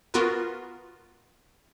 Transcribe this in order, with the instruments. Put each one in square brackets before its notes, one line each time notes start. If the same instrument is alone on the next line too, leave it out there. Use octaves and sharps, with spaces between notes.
[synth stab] B3 F4 F#4 A#4 B4